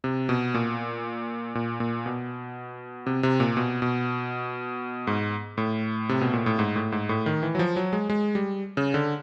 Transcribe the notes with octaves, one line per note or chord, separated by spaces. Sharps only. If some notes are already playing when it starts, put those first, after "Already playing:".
C3
B2
A#2
A#2
A#2
B2
C3
C3
A#2
B2
B2
G#2
A2
C3
B2
A#2
A2
G#2
A2
G#2
A2
D#3
E3
F#3
F3
F#3
G#3
G#3
G3
C#3
D3